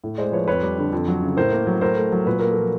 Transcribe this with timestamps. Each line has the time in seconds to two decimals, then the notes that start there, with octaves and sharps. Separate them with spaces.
0.04 A2
0.18 G#3 C5 D5
0.32 F3 B4 C#5
0.48 F2 B4 C#5
0.62 G3
0.78 D3
0.93 F2
1.08 F#3
1.23 C#3
1.37 A2 A#4 C5
1.53 A#3
1.67 F#3
1.81 A2 A#4 C5
1.97 A3
2.12 F#3
2.26 A#2 B4
2.39 A#3 A#4
2.51 A4
2.57 F3